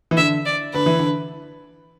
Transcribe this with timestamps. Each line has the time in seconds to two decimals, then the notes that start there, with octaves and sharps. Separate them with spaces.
0.11 E3
0.17 D3 E5
0.45 D5
0.74 D3 B4
0.86 E3
0.99 D3